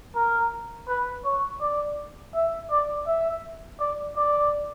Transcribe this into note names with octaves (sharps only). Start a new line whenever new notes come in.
A#4
B4
C#5
D5
E5
D5
E5
D5
D5